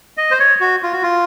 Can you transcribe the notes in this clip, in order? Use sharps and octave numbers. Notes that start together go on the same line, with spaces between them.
D#5
C5
C#5
F#4
F4
F#4
F4